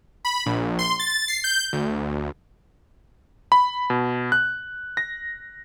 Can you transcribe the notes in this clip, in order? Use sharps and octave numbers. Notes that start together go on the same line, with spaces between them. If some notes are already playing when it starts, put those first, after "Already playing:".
B5
A#1
C6
A6
C7
G6
D2
B5
B2
F#6
A#6